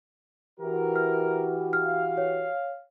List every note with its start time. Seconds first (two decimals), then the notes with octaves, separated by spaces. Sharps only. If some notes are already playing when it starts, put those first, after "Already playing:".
0.60 E3 F#4 G4 A#4
0.96 F6
1.73 F5 F6
2.17 C#5